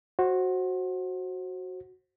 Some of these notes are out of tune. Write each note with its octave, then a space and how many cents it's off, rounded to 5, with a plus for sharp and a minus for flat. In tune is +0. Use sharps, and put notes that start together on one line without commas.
F#4 +0 C5 +25